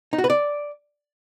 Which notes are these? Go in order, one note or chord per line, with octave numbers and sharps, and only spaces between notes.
D#4
F#4
B4
D5